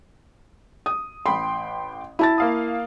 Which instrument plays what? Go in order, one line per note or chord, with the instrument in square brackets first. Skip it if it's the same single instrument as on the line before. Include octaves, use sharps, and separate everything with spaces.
[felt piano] D#6
[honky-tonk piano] A1 G5 C6 [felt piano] B5
[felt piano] E4 A5 A6
[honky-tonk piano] A#3 F5 D#6